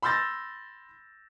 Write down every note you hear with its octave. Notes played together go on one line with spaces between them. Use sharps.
B5 C6 E6 G6 A6 A#6